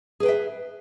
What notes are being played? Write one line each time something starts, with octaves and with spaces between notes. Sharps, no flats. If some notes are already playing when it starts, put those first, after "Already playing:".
G#4 B4 E5 G5